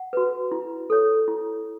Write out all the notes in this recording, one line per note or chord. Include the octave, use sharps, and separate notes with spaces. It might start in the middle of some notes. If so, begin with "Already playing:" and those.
Already playing: F#5
F#4 B4
E4
A4 C#5
E4